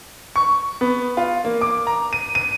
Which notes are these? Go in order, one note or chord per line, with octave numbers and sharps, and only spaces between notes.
C#6
B3
F4
A#3
D6
A#5
D#7
D#7